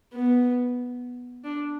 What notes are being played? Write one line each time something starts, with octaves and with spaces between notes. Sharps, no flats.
B3
D4